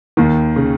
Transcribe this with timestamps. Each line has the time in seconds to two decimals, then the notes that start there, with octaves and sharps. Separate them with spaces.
0.17 D#2 D#3
0.56 C#3